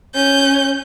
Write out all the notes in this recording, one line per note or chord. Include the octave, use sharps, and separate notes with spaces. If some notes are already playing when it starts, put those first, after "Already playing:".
C#4 G6